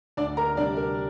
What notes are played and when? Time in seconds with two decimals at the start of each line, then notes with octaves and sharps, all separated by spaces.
0.17 D2 D4 D5
0.37 A#4 A#5
0.57 C3 G3 D4 D5
0.77 A#4